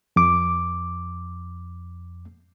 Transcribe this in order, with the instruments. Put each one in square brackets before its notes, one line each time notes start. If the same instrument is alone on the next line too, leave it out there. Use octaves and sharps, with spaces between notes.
[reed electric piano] F2 D6